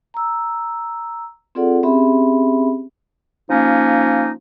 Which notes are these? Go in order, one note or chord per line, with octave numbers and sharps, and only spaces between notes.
A#5 E6
C4 F4 G#4 A4 D5 F#5
C4 C#4 G4 G#4 E5 B5
F3 A#3 C#4 D#4